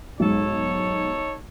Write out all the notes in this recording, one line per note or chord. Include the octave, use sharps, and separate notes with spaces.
B1 G#2 D#4 A4 C#5